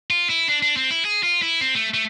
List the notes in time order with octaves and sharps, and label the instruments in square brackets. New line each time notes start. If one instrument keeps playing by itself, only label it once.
[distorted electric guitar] F4
E4
D4
D4
C4
E4
G#4
F4
E4
C4
A3
A3